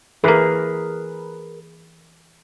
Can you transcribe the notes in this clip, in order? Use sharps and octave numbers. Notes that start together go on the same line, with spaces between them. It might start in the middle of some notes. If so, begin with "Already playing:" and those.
E3 A#3 G#4 A#4 B4